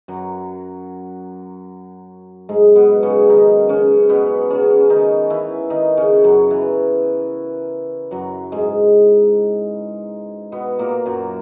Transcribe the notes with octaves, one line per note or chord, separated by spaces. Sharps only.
F#2 F#3
G#2 G#3
B2 B3
C#3 C#4
D#3 D#4
C#3 C#4
B2 B3
C#3 C#4
D#3 D#4
E3 E4
D#3 D#4
C#3 C#4
F#2 F#3
E3
F#2 F#3
G#2 G#3
B2 B3
A#2 A#3
F#2 F#3